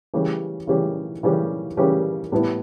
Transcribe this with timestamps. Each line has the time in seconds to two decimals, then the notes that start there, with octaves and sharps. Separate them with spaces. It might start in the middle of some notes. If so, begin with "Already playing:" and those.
0.14 C#3 E3 G3 C#4 G4
0.67 C#3 E3 G3 C#4 G4
1.23 C#3 E3 G3 C#4 G4
1.77 C#3 E3 G3 C#4 G4
2.32 A2 G3 B3 E4